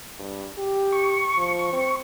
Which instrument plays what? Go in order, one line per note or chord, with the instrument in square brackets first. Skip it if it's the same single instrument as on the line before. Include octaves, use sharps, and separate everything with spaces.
[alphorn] G2
G4
[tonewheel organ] C#6
[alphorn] F3
C4